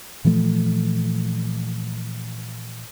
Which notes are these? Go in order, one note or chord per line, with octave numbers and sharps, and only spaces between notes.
A#2 E3 F3 A3